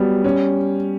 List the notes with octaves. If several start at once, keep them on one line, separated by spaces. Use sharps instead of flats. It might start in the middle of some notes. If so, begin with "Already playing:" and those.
Already playing: F#3 G3 B3
C#4